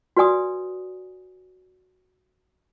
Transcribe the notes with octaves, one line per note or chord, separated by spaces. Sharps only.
F#4 B4 D5 G#5 D#6